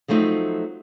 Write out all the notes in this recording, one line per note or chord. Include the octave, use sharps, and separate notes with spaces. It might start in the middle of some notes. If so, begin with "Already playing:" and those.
F3 F#3 A3 C4 D#4